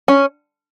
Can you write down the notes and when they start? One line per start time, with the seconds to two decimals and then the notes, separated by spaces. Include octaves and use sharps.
0.08 C#4